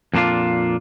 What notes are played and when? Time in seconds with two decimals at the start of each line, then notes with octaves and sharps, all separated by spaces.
0.14 F2 A#2 D4 F4